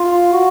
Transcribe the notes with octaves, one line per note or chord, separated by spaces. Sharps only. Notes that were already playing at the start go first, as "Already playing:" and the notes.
Already playing: F4
F#4